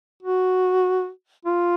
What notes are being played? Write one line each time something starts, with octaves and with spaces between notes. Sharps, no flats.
F#4
F4